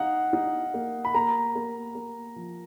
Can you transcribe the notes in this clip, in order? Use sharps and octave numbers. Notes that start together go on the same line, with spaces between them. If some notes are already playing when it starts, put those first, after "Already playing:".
Already playing: D#4 F5 F#5
D#4
A#3
B5
A#3 A#5
A#3
A#3
F3